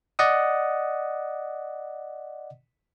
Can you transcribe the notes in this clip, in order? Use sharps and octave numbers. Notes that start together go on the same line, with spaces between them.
D5 D#5 F#5 D#6